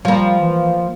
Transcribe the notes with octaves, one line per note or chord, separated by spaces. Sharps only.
F3 G3 A#3
E3